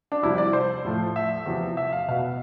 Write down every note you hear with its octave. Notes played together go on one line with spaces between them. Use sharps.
D4
C2 C3 F3 E4
D5
C5
A2 F3 A3
E5
E2 C3 F3
E5
F5
B2 B3 F5